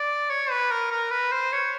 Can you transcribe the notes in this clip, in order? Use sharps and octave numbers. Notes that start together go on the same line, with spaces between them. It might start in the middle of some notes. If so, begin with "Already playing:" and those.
Already playing: D5
C#5
B4
A#4
A#4
B4
C5
C#5